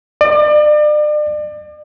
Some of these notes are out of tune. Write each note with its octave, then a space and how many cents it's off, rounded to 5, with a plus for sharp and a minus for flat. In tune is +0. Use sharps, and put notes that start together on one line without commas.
D5 +35